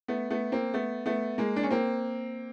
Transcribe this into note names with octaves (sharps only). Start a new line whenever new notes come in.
A3 B3
A3 B3
A#3 C4
A3 B3
A3 B3
G#3 A#3
D4
C#4
A#3 C4